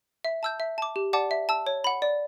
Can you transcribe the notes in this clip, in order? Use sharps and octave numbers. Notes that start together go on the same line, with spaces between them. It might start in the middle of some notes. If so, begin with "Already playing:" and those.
E5
A5 E6 G6
E5
A5 D6
G4
D5 F#5 A5 D6
E5
A5 E6
C#5
F#5 B5
D5